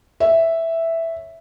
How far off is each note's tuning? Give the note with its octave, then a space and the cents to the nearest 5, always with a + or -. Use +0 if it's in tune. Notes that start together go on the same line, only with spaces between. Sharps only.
C#5 -5 E5 +0